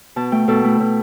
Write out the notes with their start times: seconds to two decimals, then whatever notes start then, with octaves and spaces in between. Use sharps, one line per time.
0.16 B2 A5
0.32 A3 G5
0.48 B2 A4
0.64 A3 E4
0.80 B2